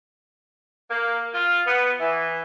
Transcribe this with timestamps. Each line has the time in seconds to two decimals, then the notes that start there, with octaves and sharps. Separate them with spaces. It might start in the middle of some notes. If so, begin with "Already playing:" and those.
0.90 A#3
1.34 F4
1.67 B3
2.00 E3